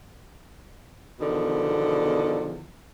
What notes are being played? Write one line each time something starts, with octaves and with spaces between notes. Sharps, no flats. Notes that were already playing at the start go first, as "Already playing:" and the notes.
E2 B2 D3 D#3 F3